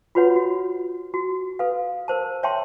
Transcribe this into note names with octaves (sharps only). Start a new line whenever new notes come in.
F4 F#4 B4 C#5 F#5
F#4
F#4
A4 B4 F5
A#4 C5 A5
C#5 E5 G5 A5 C6